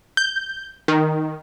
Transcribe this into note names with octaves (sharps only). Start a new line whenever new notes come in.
G6
D#3